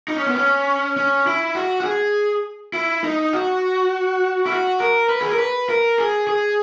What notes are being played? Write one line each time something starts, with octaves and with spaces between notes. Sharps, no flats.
D#4
C#4
B3
C#4
C#4
E4
F#4
F#4
G#4
E4
D#4
F#4
E4
F#4
A#4
B4
G#4
A#4
B4
A#4
G#4
G#4